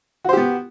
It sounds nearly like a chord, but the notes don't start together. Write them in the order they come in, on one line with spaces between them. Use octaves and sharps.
F#4 C5 G4 B3